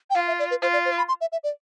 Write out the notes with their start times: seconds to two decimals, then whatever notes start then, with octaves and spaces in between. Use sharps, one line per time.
0.10 G5
0.15 F4 F5
0.27 E5
0.39 D5
0.51 B4
0.62 F4 C5
0.73 D5
0.85 C5
0.98 B5
1.08 C6
1.21 E5
1.32 E5
1.44 D5